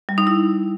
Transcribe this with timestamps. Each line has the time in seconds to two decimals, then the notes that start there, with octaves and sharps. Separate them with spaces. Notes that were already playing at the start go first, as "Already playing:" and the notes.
0.09 G3
0.18 D#4
0.27 E4